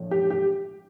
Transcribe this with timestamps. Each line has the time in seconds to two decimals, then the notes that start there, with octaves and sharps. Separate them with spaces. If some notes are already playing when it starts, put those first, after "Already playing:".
Already playing: A#1 A2 F3
0.11 G4
0.30 G4